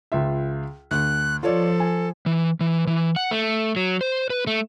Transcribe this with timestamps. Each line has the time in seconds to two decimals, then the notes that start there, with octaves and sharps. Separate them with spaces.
0.12 C#2 F4 E5
0.91 D2 F#6
1.43 F3 F4 A4 C#5 D5
1.80 G#5
2.26 E3
2.61 E3
2.87 E3
3.16 F#5
3.31 A3
3.76 F#3
4.01 C5
4.30 B4
4.47 A3